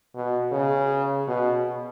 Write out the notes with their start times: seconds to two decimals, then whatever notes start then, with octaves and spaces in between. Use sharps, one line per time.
0.15 B2
0.52 C#3
1.28 B2